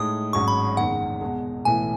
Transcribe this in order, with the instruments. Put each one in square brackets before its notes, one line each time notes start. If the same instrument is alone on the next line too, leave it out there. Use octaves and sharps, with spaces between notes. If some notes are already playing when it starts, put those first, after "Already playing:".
Already playing: [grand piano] A2 G#3 D#4 [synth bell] D#6
[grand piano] G#1 G#2 F#3 C#4 G#4 [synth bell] C#6
[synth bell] B5
[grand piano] F#1 E2 D#3 G#3 [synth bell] F#5
[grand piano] E2 B2 G#3
[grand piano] B1 A2 E3 A3 E4 [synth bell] G#5